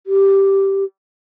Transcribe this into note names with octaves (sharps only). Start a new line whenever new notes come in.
G4